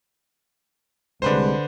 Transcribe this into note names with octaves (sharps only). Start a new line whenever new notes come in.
C2 D3 G3 G#3 B4 C5